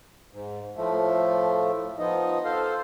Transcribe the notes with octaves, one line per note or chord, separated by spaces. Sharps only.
G#2
A2 F3 A3
F3 B3 D#4 D#5
A4 C5 F5